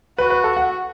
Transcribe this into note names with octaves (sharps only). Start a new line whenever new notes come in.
F#4 B4
B4
A4
F#5